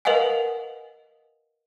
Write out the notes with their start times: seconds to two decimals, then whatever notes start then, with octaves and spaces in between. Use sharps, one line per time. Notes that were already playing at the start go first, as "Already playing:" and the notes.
0.05 A#4 B4 D#5 F5 F#5 G#5